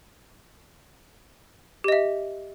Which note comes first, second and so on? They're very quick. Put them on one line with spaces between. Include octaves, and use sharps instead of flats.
G4 D#5 E5